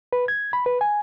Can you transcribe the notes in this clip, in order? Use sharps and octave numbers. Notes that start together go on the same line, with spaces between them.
B4
G#6
B5
B4
G#5